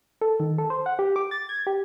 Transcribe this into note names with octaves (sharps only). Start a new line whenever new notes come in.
A4
D#3
A4
C5
F#5
G4
D6
A6
G#6
G4